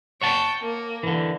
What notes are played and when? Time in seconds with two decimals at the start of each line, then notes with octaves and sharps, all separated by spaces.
0.22 C#5 F#5 G5 A5
0.61 A#3
1.03 D3 E3